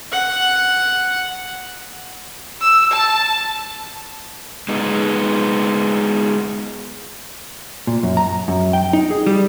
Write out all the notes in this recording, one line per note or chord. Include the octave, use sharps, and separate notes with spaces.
F#5
E6
A5
G#3 B3 D#4
A#2
F#2
A#5
F#2
G5
D#4
G#4
G3